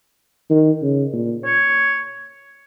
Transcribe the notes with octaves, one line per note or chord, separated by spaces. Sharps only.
D#3
C#3
A#2
C#5